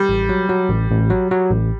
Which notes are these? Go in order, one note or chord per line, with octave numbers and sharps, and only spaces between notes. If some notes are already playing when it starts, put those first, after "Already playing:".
Already playing: G3
A1
F#3
F#3
A1
A1
F#3
F#3
A1